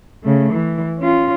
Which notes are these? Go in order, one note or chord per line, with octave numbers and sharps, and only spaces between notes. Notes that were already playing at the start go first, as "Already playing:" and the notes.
C#3 A3
E3
C#4 F4